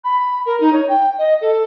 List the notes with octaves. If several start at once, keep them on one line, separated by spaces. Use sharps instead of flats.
B5
A#4
D#4
C#5
G5
D#5
A4